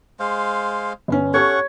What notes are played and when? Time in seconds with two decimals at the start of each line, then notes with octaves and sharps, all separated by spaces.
0.20 G#3 C5 F5
1.08 G1 B3 C#4
1.34 C#4 G4 A4 C#5 F#5 C#6